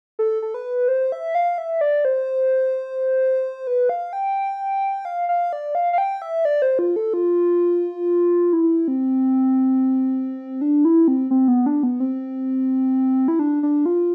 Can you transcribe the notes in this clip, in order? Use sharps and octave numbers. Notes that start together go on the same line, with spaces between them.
A4
A4
B4
C5
E5
F5
E5
D5
C5
B4
F5
G5
F5
F5
D5
F5
F5
G5
E5
D5
C5
F4
A4
F4
E4
C4
D4
E4
C4
C4
B3
D4
B3
C4
E4
D4
D4
F4